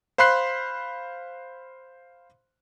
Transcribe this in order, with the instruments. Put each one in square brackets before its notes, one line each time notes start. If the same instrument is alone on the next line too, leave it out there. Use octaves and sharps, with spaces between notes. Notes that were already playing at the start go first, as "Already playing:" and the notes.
[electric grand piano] C5 F5 B5 C6 F#6 C7